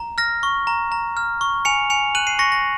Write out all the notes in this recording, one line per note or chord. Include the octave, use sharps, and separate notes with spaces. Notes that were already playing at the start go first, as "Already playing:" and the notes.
Already playing: A#5
F6 A#6
C#6
A#5
A#5
F6
C#6
G#5 C#7 F7
G#5 C#7 F7
F#6 D#7 F#7
C7 D#7
C#6 A#6 C#7
A#6